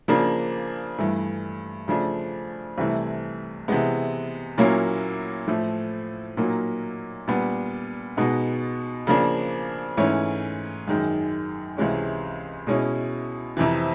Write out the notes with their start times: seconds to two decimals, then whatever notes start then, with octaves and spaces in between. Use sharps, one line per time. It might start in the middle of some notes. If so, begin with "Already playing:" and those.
0.08 C#3 F3 A#3 D4
0.98 G2 E3 A3
1.88 C#3 F3 A3 D4
2.78 C2 C3 E3 A3
3.68 C3 E3 G#3 B3
4.58 A#2 F#3 A#3 C#4 E4
5.47 A2 F3 A3
6.37 A#2 F#3 A#3 D#4
7.28 A#2 G3 B3 D4
8.17 B2 G#3 B3 D#4
9.07 C#3 F3 A#3 D4
9.97 G#2 E3 A3 C#4
10.88 F#2 D#3 G#3
11.77 C#2 C3 E3 G#3 C#4
12.67 B2 G#3 C#4 E4
13.57 F2 C3 E3